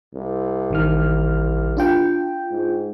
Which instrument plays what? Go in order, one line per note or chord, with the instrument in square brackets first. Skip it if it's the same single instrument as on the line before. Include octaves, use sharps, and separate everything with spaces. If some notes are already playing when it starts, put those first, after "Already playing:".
[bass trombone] C2
[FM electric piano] A1 D#3 F6
D4 F4 G5
[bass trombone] G#2